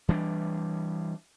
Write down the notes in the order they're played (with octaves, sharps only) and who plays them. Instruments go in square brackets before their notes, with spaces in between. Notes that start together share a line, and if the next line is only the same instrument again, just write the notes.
[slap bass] E3 G3 D4